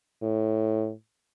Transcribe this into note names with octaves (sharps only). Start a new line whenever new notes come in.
A2